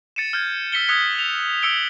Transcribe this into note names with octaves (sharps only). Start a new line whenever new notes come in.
A6 C#7 D#7 E7
F6 G6 G#6
E6 B6 C#7 G7
D#6 E6 F#6 G#6 B6 C#7
F7
E6 C#7 D7 G7